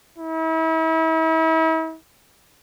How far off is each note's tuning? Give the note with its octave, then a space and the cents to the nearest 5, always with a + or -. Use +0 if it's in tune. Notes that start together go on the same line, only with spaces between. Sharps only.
E4 -40